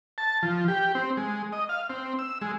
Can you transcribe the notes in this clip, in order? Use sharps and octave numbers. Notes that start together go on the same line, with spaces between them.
A5
F3
G4
C4
G#3
D#5
F5
C4
E6
G#3